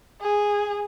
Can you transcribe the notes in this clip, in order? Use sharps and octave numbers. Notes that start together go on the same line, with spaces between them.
G#4